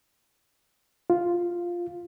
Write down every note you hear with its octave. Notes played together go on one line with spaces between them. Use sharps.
F4